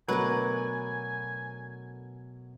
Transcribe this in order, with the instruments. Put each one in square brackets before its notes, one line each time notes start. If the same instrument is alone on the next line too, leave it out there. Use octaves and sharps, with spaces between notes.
[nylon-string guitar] B2 A3 A#4 [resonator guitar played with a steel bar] D3 B4 [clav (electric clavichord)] F#3 [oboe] G#5